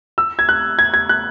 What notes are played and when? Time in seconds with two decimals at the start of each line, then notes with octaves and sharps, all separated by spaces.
0.18 E6
0.39 G#6
0.49 F#6
0.79 G#6
0.94 G#6
1.09 F#6